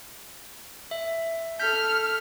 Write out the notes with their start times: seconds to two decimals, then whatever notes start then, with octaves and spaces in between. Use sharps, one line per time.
0.91 E5
1.60 A4 F6 G6 B6